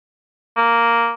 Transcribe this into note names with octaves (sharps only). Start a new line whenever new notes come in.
A#3